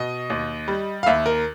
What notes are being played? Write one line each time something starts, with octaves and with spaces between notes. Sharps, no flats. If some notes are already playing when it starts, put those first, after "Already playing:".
Already playing: B2 D#5
D#2
G3
F5
D#2 E5
A#4